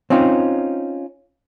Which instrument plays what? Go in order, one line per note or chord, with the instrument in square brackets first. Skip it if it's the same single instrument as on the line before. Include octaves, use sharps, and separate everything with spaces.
[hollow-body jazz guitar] C4 C#4 D#4 F4